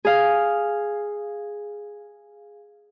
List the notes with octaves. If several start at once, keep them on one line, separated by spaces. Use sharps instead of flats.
G#4 F5